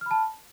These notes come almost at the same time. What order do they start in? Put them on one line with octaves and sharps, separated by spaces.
F6 B5 A5